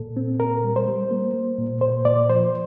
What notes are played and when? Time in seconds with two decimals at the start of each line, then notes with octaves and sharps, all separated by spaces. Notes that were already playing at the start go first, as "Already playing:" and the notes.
Already playing: A#2 A4
0.17 C4
0.40 A#2 A#4
0.64 G3
0.76 C5
0.88 G3
1.11 A#3
1.34 A#3
1.58 A#2
1.81 A#2 C5
2.05 A#2 D5
2.29 F3 C5